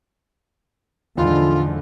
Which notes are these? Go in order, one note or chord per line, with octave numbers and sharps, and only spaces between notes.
E2 A2 D3 F3 D#4 F4